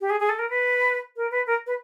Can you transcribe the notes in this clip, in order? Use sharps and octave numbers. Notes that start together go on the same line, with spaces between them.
G4
G#4
G#4
A4
A#4
B4
A#4
B4
A#4
B4